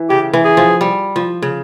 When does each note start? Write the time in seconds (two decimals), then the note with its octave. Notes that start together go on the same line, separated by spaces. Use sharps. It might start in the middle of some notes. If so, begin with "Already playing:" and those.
Already playing: E3
0.10 C#3 G4
0.33 E3
0.45 G#4
0.57 F3
0.81 G3
1.16 F3
1.42 C#3